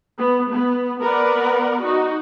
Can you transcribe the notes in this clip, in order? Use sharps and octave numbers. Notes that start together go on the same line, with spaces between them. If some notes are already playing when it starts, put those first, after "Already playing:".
B3
B3
B3 A#4 B4 D5 F#5
D#4 F#4